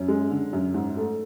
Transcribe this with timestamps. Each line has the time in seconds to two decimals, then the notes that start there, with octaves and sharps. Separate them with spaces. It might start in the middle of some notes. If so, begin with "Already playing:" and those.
Already playing: F#2 C#4
0.08 G#3
0.31 D3
0.53 F#2
0.74 G#2
0.97 A3